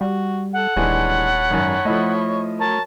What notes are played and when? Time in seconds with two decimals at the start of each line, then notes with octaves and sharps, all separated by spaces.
0.01 G3 F#4
0.53 A4 F#5
0.76 D#1 E3 G#3 D4 C#5 A5 B5
1.51 G#1 F#2
1.85 F3 A3 E4 D#5
2.60 F#3 A#4 C#5 A5